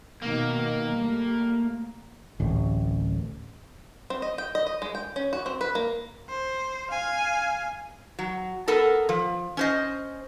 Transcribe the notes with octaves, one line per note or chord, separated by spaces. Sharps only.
B2 D#3 A#3
G3 A3
D1 A1
C4
D#5
G5
D#5
D#5
G#3
G5
C#4
F#4
C4
B4
A#3
C5
F5 G#5
F#3
B3 A4 A#4
F3
C#4 C5 D#5